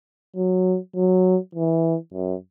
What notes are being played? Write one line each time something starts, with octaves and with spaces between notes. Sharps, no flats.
F#3
F#3
E3
F#2